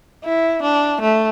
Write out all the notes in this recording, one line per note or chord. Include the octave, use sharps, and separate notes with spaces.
E4
D4
A3